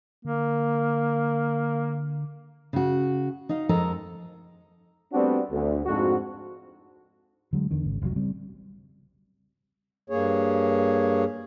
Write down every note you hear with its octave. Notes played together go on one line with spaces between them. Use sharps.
D3 A#3
C#3 F#4
D#4 D#5 F5
F2 G#3 A4 A#4 D#5 A#5
G3 A3 B3 C4 D4 F#4
D2
F2 G#2 D4 F#4
D3 F#3 G#3
E2 D3 D#3
G#1 C#3
F1 C2 F2 F#3
C#3 G3 C4
G2 A#3 G#4 C#5